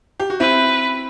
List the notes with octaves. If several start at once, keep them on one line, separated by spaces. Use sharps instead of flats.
G4
F#4
C4 E4 B4